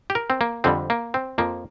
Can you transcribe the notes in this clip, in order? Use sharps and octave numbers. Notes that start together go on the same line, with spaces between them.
G4
A#4
C4
A#3
F2 D3 G3 C4
A#3
C4
F2 F3 A#3